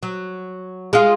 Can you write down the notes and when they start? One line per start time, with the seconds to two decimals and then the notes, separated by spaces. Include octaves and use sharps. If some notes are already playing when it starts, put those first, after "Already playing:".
0.03 F#3
0.93 G#3 F4